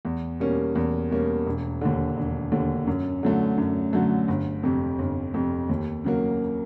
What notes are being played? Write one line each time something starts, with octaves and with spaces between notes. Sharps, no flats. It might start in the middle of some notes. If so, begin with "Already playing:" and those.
E2
B2 G3 A#3 C#4
E2
B2 G3 A#3 C#4
E1
D#2 D3
E1
D#2 D3
F#2
D3 F#3 A3
F#2
D3 F#3 A3
G1
F2 C3
G1
F2 C3
D#2
C#3 F#3 A#3